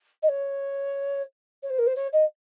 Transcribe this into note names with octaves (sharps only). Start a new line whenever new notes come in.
D#5
C#5
C#5
C5
A#4
C5
C#5
D#5